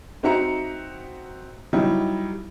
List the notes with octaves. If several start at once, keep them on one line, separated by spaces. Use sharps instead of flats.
C4 D#4 F#4 E5 A#5 C#7
F#3 G3 D#4 E4